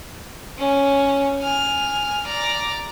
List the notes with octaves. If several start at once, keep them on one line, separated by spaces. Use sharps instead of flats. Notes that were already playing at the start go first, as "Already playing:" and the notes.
C#4
G#5 F6
D5 A#5